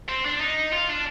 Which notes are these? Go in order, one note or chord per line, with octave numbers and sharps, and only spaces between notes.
C4
D4
D#4
F4
D4